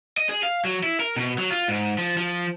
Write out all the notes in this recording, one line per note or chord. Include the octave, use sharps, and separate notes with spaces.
D#5
G#4
F5
F#3
E4
A#4
B2
F#3
F4
G#2
F3
F3